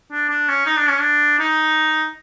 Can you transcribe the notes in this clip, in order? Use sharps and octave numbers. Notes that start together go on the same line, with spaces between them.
D4
D4
C#4
D#4
D4
C#4
D4
D#4